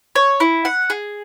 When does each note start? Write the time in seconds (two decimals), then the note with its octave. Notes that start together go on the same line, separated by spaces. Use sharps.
0.16 C#5
0.40 E4
0.65 F#5
0.90 G#4